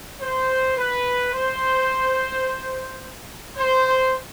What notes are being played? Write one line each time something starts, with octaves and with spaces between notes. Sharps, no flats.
C5
B4
C5
C5